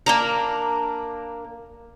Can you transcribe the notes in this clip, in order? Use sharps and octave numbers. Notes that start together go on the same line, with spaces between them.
A#3 D4 A#4